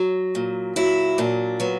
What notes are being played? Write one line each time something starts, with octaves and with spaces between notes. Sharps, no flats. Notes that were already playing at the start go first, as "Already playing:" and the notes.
Already playing: F#3
A#2
F#3 E4
A#2 D4
F#3 B3